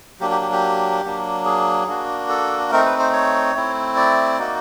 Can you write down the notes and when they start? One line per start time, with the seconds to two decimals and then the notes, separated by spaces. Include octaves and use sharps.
0.20 F#3 A#3 D4 G4
0.30 G4
0.41 G4
0.52 G4
1.04 F#3 A#3 D4
1.45 G#4
1.88 A#3 D4 F#4
2.29 A4
2.71 A3 C4 D#4 A#4
2.85 B4
2.99 C5
3.13 C#5
3.55 A3 C4 E4
3.96 D5
4.39 A#3 D#4 F#4